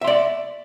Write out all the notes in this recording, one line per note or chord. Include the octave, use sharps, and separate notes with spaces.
D5 E5 C6